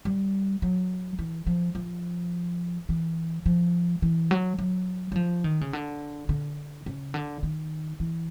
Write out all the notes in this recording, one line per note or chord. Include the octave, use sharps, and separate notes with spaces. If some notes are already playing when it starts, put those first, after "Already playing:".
G3
F#3
E3
F3
F3
E3
F3
E3
F#3
F#3
F#3
F3
D#3
C#3
D3
D3
C#3
D3
D#3
E3